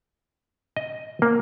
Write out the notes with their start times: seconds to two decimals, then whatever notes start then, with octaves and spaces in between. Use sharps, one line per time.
0.77 D#5
1.22 A#3